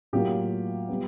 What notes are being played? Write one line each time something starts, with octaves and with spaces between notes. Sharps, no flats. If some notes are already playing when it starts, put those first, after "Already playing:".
A2 F#3 A#3 F4 G4
G3 B3